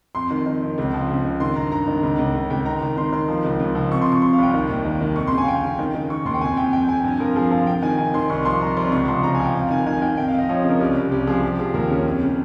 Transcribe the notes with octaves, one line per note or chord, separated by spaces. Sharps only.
F2 C6
D#3
D#3
F2
C#2
F3
C#3
C#2
D#3 C6
G2 A#5
G2 A#5
D#3
C#2
C#2
C#2
C#2 G5
D#3 A#5
D#3
D#3 C6
D#3 C6
F3
C#2
C#2
F3
C3 C#6
C6
C3
C#6
C3 C6
F5
C2 G5
D#3
D#2
D#3
D#3
F2 C#6
C6
C#3
G#5
F5
F2 G5
C#3
D#3
D#3
D#3 C#6
D#2 C6
G5
F2 G#5
F2 G5
F2 G5
C3 G#5
G2 G#5
F3 A#4
F3 G#4
F3 F5
C3 G5
D#3 G#5
C3 G#5
D#3 C6
C2 C#6
F3 C6
F3 A#5
C2 C6
C#2 C#6
F3 C6
C#2 A#5
G#5
F3 G5
F2 F5
D#3 G#5
D#3 G#5
D#3 G5
F2 G5
F5
F2 D#5
F3 C#5
C#3
A#4
C2 G4
C2
C2 G4
F3 G#4
F3 G4
F3 G#4
D#2 A#4
C#3 C#5
F2
C#3